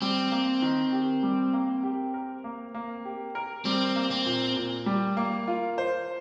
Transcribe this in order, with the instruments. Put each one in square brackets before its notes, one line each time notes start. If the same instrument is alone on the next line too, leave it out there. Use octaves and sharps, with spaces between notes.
[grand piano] G3 [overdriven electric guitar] C4
[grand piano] A#3
D#3
G4
G3
A#3
G4
A#4
A#3
A#3
G4
A#4
[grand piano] G3 [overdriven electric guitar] C4
[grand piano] A#3
[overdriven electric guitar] C4
[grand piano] A#2
A#2
G3
A#3
F4
C5